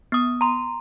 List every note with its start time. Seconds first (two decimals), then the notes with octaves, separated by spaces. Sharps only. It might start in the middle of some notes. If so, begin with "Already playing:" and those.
0.12 B3 D#6
0.41 A#5 C6